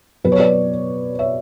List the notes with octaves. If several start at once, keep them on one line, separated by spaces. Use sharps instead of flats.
B2 F#3 B4
C#5
B4 D5
C#5 E5